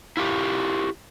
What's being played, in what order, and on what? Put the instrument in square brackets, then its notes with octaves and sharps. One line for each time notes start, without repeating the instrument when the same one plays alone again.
[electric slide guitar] E4 F4 G4